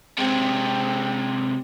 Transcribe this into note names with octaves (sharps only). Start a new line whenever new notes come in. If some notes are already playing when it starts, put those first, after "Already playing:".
C3 G#3 C4